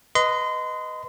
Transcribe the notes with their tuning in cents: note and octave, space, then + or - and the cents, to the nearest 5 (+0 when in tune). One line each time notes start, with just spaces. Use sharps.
B4 +0 D#5 +0 C6 -30